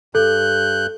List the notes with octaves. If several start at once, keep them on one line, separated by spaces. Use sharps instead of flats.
G2 A4 F#6 G6